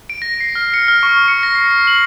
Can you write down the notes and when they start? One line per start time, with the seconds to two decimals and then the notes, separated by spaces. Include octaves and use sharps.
0.10 D7
0.22 A#6
0.40 C7
0.55 F6
0.74 C#7
0.88 F6
1.03 C#6
1.28 C#7
1.43 A#6
1.55 C7
1.71 C7
1.87 F#7